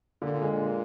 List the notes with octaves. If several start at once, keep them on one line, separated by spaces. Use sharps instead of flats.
A#2 D3
G#3
A#2